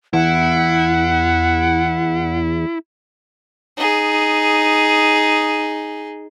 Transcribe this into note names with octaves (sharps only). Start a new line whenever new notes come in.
E2 E4 F#5
D#4 G#4